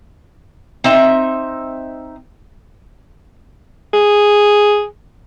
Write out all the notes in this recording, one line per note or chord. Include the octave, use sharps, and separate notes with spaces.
C4 D#4 E5
G#4